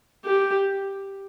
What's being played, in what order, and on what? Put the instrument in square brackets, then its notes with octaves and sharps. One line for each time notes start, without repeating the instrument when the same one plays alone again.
[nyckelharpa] G4